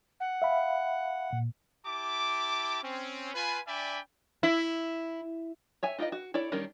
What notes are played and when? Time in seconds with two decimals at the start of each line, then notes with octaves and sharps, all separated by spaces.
0.20 F#5
0.42 E5 F5 B5
1.33 A#2
1.86 E4 G4 A5 D6
2.83 C4 C#4
3.34 F4 B4 G#5
3.67 D4 D5 E5 G5 G#5 B5
4.43 E4
5.83 C#5 E5 G#5
5.98 D#4 F4 G4 B4 D#5
6.12 F#4
6.34 E4 A4 C#5 D5
6.52 D#3 G3 C#4 D4 A#4